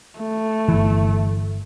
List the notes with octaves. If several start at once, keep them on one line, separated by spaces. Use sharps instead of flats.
A3
G1 E3